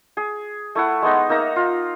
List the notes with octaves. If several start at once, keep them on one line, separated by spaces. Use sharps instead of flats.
G#4
A3 E4 F#5
G#3 B3 D#4
A#3 D#4 E5 A#5
F4